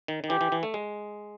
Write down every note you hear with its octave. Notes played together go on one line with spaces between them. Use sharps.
D#3
D#3
E3 G4
E3
E3
A3
G#3